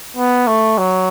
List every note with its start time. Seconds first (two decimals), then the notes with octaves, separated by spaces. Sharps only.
0.17 B3
0.47 A3
0.78 F#3